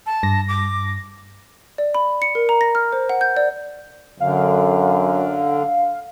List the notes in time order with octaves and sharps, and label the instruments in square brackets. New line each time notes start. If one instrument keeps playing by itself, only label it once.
[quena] A5
[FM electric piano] G2 A#6
[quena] D6
[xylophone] D5
B5
C#7
A#4
A#5
A#6
F6
C5
F#5
G6
D5
[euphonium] F#2 [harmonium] D3 [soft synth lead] F5